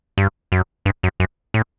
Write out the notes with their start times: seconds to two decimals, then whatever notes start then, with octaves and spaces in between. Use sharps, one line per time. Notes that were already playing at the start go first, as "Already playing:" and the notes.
0.18 G2
0.52 F#2
0.85 G2
1.03 F#2
1.20 F#2
1.54 A2